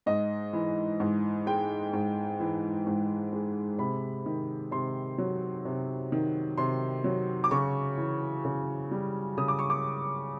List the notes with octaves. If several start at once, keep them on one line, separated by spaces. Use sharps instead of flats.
G#2 D#5
E3
G#2
G#3 G5
G#2
E3
G#2
G#3
C3 B5
D#3
C3 C6
F#3
C3
D#3
C3 C6
F#3
D6
C#3 C#6
E3
C#3
G3
C#3 D#6
D6
C#6
D6